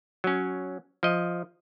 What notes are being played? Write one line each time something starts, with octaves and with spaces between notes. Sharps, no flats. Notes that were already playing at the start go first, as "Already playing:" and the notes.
F#3 C#4
F3 D#5